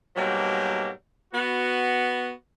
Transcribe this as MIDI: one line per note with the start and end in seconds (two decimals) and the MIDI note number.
0.15 0.88 44
0.15 0.88 47
0.15 0.88 54
0.15 0.88 55
0.15 0.88 58
1.33 2.31 59
1.33 2.31 66